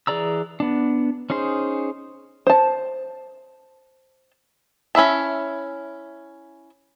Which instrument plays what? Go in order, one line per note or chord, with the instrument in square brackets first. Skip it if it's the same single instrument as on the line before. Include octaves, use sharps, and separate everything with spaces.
[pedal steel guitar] E3 G#4 D5 A#5 E6
B3 D4
C#4 D#4 G#4 C5
[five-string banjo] C5 A5
C#4 E4 E5 A5